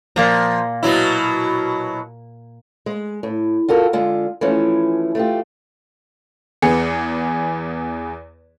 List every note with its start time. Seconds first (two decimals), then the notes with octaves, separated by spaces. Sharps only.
0.16 A#2 F3 A#3 A#5
0.83 B2 F#3 E4
2.86 G#3
3.23 A2
3.68 F4 F#4 A4 A#4
3.93 D3 G#3 F4
4.41 E3 F3 A3 C#4
5.15 A3 F4 G4
6.62 E2 B3 G#4 C#7